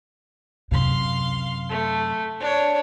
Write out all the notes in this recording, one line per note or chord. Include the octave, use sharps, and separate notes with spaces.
F#2 C3 F5 C6
A3
D4 C#5